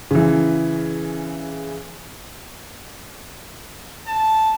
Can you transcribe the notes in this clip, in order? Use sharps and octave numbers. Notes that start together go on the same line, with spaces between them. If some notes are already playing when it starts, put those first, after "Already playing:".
C#3 E3
A5